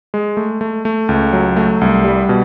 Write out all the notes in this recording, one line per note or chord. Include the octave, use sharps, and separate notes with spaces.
G#3
A3
A3
A3
C#2
F#3
A3
C2
G3
B2